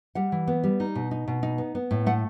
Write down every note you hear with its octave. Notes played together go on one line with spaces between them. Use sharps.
G3 F#5
E3
B3
G3
D#4
B2
D#4
B2
D#4
B3
B3
A2
A3 F#5